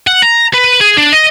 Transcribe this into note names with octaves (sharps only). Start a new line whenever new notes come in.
F#5
A#5
B4
G#4
D4
D#5